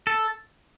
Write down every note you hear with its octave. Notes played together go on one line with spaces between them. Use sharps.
A4